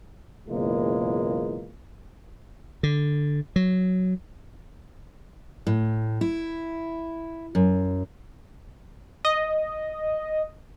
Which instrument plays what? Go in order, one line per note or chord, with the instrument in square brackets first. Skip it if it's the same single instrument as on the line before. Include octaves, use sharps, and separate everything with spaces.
[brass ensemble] F#1 B2 E3 G#3 A#3 F4
[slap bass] D3
F#3
[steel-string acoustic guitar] A2
E4
F#2
[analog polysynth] D#5